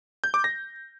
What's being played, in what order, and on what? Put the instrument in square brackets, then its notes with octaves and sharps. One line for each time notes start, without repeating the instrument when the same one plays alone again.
[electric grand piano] G6
D6
A#6